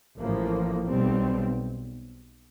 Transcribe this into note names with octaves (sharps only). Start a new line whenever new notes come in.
A1 A2 F3 A#3
B1 B2 G3 C4